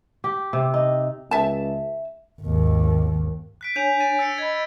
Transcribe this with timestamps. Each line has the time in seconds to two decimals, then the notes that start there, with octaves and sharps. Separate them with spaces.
0.24 G4
0.53 C3
0.74 D#4
1.31 C#2 E5 A5
2.42 G#1 D#2
3.61 F#6 B6 D7
3.76 D4 C#5 G#5 G6 D#7 F7
4.00 A6 D#7
4.19 E6 A6 C#7
4.38 D#5 B5 G#6